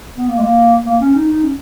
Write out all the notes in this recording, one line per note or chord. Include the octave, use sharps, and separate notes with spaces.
B3
A#3
G#3
A#3
A#3
C#4
D#4
D#4
C#4